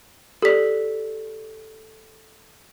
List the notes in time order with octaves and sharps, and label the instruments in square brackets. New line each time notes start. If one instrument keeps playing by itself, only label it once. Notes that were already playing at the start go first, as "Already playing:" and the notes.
[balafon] G4 D5 [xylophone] A4 B6